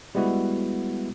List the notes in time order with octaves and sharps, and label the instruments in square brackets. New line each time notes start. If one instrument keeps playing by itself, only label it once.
[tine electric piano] G3 G#3 B3 E4 F#4